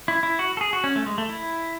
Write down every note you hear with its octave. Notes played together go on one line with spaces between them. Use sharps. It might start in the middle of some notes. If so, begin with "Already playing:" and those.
E4
E4
F#4
A4
G#4
F#4
C#4
A3
G#3
A3
E4